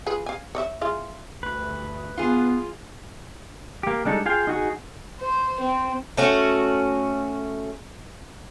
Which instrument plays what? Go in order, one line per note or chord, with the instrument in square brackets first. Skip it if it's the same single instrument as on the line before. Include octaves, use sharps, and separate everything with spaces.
[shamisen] F4 G#4 B4
F5 G#5
C#5 D5 E5
E4 F4 G#4
[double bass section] D2 G2 [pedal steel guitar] B4
[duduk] B3 [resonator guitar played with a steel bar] F4 G#4
[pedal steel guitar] A#3 G4
G3 G#3 D4 D#4 A4
F4 G#4 F5 G5
D#4 F#4 G#4
[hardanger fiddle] C5
C4
[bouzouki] A3 C#4 F#4